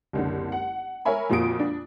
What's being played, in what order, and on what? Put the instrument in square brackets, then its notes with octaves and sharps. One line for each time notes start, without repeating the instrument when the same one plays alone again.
[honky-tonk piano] F#1 C2 D3
F#5
A#4 C#5 E5 G#5 B5
F2 A#2 F4 F#4 D#6 D7
D4